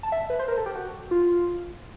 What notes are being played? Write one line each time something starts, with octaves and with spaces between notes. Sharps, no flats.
A5
E5
B4
C5
A#4
A4
G4
F#4
F4